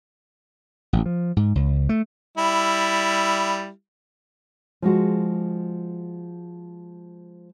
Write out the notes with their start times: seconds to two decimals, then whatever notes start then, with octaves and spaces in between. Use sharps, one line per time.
0.93 A1
1.06 F3
1.37 G#2
1.55 C#2
1.89 A3
2.38 G3 E4
4.82 F3 G#3 F#4